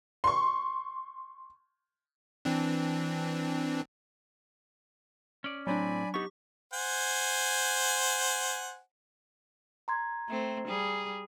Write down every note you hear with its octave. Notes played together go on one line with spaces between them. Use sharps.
C6 C#6
E3 C4 D4
C#4 D5
A2 F#3 C4 D4 D5 G#5 B5
B3 D#4 G4 C#6
C5 F#5 G#5
A#5 C6 G#6
A3 C4
G3 G#4